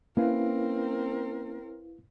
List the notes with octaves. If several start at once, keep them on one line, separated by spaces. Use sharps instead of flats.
A#3 C4 C#4 E4 A#4 B4 F5